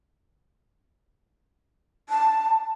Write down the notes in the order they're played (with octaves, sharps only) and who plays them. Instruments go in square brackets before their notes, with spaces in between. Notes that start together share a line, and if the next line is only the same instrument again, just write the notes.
[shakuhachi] A5